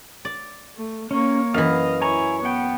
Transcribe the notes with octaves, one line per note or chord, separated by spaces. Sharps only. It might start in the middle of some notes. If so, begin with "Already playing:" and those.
D5
A3
A#3 C#4 C#5
F#2 E3 D#5 F5
E4 C#5 G#5 A#5 C#6
B3 F#5 G5